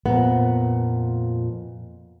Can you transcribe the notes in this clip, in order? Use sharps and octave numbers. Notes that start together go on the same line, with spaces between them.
F2 A#2 B3